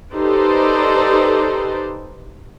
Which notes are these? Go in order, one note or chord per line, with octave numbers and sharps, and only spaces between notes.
D#4 G4 A4 B4 C5 D5